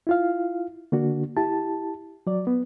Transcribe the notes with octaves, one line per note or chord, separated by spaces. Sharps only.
E4 F4 F5
D3 A#3 D4 F#4
E4 G4 A5
F#3 D5
B3